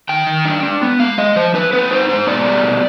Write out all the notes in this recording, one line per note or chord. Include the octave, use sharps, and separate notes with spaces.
D#3 G5
D#3
D4
D4
B3
G#3 F5
G#3 D#5
F3 C5
D#4 B4
C4 B4
D#4 C5
G#2 C5
B2 D5
G3
B2